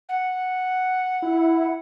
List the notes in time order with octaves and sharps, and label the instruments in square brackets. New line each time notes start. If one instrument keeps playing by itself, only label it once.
[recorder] F#5
[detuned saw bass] E4